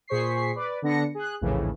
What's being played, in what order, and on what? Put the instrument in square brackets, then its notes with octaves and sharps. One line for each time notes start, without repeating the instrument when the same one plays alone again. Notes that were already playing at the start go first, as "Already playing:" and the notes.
[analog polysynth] A#2 G#4 C5 C#6 B6 C7
B4 D5
D3 B3 D4 A#6 C#7
G#4 F#6
A#1 D#2 A2 C#3 E3